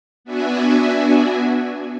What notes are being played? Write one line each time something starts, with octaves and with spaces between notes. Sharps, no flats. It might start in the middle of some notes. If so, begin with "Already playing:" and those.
B3 D4 F#4 E5 G#5